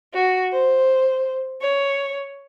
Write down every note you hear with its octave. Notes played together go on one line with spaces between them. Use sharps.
F#4
C5
C#5